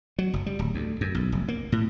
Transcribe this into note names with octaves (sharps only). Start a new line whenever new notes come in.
F#3
F#1
G3
D1
D2
F#2
B1
F1
A#3
A2